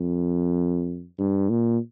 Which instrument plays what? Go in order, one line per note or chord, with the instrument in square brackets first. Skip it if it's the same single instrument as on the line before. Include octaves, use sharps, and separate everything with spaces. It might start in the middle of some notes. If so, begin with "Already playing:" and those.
Already playing: [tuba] F2
G2
A#2